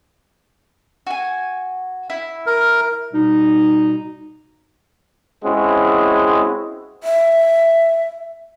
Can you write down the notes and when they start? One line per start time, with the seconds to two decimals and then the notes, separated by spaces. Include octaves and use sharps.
1.07 F#4 G#5
2.10 E4
2.46 A#4
3.12 B2 G3 D#4
5.44 G#3 C4 C#4 E4 F#4 G#4
7.03 E5